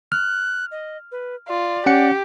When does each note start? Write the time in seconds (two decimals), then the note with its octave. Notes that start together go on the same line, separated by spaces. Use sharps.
0.12 F6 F#6
0.72 D#5
1.12 B4
1.48 F4 D5
1.86 C#4 G4 F#5 C#7